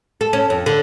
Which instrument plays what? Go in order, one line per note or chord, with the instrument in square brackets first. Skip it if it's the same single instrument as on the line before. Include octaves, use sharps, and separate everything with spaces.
[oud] A4
C#4
F2
D3